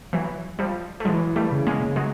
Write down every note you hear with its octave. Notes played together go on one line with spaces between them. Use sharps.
E3 F#3
F3 G3
A3
E3 F#3 G#3
G3 A3
C#3
G#3 A#3
F#3 G#3